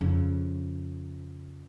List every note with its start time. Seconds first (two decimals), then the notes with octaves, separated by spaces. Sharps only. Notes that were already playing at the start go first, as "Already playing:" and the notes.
0.01 F2 C#3